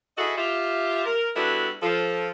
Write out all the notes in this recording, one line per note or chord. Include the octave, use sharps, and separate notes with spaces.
E4 F#4 G#4 A4 D#5 E5
F4 G4 E5
A#4
G3 B3 D4 E4 F#4 A4
F3 A4